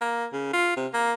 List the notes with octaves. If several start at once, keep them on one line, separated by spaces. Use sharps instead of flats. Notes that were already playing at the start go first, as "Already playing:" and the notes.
A#3
C#3
F4
C3
A#3